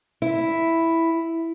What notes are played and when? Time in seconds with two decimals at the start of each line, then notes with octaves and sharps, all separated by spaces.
0.22 E4